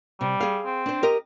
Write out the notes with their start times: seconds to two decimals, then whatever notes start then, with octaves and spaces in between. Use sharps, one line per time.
0.21 C3 G3
0.40 G#4 F5
0.65 C4
0.86 D4 C5
1.03 G4 A#4 D#5